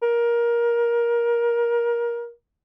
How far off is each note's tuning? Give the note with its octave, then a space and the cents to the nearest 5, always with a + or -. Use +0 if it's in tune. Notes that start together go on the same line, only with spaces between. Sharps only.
A#4 +20